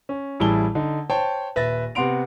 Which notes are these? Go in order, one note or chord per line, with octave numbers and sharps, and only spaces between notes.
C#4
A1 G3 E4 G#4 A5 G7
D3 D#4
C5 C#5 G5 A5
D#1 B4 E5 A6 A#6
C3 B3 F#5 C6 D7 F7